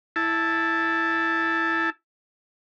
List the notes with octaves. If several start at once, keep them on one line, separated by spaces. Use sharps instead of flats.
E4 A5